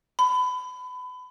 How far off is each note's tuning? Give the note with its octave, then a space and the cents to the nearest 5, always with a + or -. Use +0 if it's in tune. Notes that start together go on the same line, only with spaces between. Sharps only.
B5 +30